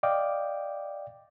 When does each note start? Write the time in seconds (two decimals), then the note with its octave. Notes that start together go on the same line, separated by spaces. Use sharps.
0.03 D5 D#5 F5 G5 D6